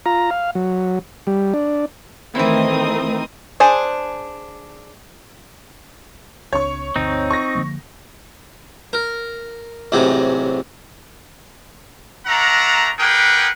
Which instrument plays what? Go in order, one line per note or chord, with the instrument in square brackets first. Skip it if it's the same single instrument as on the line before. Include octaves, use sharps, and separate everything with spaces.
[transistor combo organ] F4 A#5
F5
F#3
G3
D4
[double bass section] D#3 A3 [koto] E3 E4 [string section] C4 A#4 D#6
[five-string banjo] D4 G#4 C5
[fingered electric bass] C#2 C4 D4 [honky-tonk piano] C#5 C#6
[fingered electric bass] G1 D2 [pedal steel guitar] C4 D#4
[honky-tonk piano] C#6 A#6
[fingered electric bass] D3 F3 A#3
[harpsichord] A#4
A1 G#2 C3 F#3
[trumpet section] A3 D4 F#5 A#5
G4 G#4 A#4 B4 F#5 G5